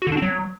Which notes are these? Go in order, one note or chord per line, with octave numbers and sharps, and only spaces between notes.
F#4
D3
D4
C4
F#3